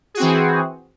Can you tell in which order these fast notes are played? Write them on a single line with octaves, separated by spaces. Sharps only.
G#4 F#4 C4 E3